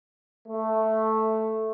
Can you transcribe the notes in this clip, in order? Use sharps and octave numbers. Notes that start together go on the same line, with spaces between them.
A3